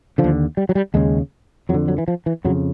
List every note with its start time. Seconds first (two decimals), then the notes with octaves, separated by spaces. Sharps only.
0.18 D3 F3
0.24 D#2
0.57 G3
0.69 F#3
0.75 G3
0.94 D#2 C#3 G#3
1.69 F2 F#3
1.74 D3
1.88 F#3
1.98 E3
2.08 F3
2.26 E3
2.44 F2 C#3 F#3